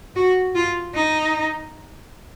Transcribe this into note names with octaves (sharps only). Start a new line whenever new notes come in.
F#4
F4
D#4